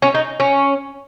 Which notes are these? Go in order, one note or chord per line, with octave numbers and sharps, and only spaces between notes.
C#4
D#4
C#4